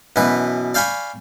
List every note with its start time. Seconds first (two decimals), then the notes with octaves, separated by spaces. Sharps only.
0.16 F#2 B2 E3 B4
0.74 D5 F5 G5 G#5 B5 C#6